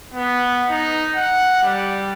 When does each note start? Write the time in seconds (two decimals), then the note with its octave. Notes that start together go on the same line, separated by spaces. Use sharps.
0.14 B3
0.70 D#4
1.16 F#5
1.63 G3